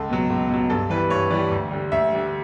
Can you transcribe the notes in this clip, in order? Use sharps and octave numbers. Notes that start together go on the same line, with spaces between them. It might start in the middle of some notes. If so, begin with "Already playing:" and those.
Already playing: C#2 A4
B2 F#3
C#2
B2 F#3
G2 A4
E3 G3 B4
G2 C#5
E3 G3 D5
D2
D3 G3
D2 E5
D3 G3